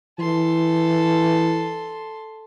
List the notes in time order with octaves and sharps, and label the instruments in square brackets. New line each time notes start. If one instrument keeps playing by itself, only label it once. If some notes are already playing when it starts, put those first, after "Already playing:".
[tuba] E3 [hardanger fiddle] A4 C6